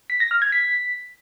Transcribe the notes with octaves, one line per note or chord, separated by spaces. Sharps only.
B6
A#6
F6
G#6
B6